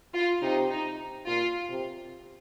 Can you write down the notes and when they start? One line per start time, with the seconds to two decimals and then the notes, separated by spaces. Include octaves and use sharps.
0.13 F4
0.42 C3 D#4
0.70 D#4
1.27 A#2 F4
1.69 C3